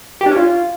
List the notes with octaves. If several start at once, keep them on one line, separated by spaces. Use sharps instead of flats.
G4
D4
C#4
F4